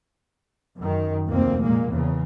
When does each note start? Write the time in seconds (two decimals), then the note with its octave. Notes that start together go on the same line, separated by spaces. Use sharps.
0.78 F#2 D#3
1.28 F1 D2 A#3 C4
1.61 A#2 G#3 A#3
1.91 E2 C#3